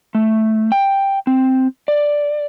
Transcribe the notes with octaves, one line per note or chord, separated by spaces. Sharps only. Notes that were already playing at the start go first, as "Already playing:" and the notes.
A3
G5
C4
D5